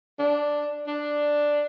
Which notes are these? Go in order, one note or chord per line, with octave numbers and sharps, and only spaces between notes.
D4
D4